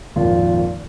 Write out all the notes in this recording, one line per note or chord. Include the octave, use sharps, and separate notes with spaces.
G#1 F2 A#2 F4